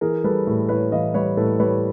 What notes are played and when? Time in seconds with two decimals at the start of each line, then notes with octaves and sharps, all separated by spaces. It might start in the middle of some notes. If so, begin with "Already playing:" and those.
0.01 E3 G#4 A#4
0.24 G3 A4 B4
0.47 A2
0.69 A2 B4 C#5
0.92 E3 D#5 F5
1.14 G3 B4 C#5
1.37 A2 A4 B4
1.60 G3 B4 C#5